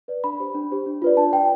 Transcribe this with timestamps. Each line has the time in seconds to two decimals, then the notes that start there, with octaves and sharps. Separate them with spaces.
0.08 B4 D5
0.24 D4 B5
0.40 G4 C5
0.55 D4
0.71 G4 C5
0.86 D4
1.02 F4 B4 D5
1.17 D4 A5
1.33 F4 B4 D5 G5